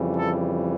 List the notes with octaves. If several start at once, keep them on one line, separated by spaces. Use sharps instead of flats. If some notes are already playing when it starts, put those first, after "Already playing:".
Already playing: F2 C#3 E3 G3
A4